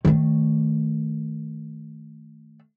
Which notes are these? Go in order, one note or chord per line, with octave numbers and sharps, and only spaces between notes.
D#3 A3